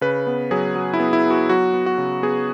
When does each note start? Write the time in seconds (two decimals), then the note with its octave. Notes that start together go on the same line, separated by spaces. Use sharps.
0.01 C#3 B4
0.27 B3
0.51 F#3 G#4
0.75 F#3
0.94 E4
1.00 B3
1.13 E4
1.25 B3
1.30 F#4
1.49 F#3 F#4
1.74 B3
1.86 F#4
1.98 C#3
2.23 B3 G#4